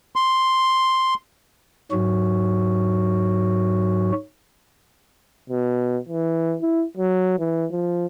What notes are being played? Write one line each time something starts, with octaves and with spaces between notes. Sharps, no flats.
C6
G#2 F#3 F#4
B2
E3
E4
F#3
E3
F3